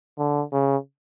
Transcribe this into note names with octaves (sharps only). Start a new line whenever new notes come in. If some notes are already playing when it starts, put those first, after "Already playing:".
D3
C#3